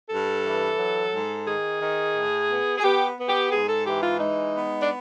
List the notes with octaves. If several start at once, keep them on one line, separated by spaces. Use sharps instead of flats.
G2 A4
E3
F#3
G#2
D#3 G#4
D#3
A2
B3
G#4
B3 G4
B3
G4
G#2 G#4
A4
E3 G4
F4
G#3 D#4
B3
D4